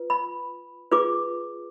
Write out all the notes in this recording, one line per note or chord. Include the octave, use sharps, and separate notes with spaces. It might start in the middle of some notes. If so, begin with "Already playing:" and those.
Already playing: F4 B4
B5
F4 G#4 B4 D6